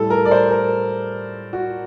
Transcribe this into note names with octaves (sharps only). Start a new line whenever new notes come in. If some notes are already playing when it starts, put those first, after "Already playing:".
Already playing: A2 G3 A4
A#4
D5
C5
A#4
F#4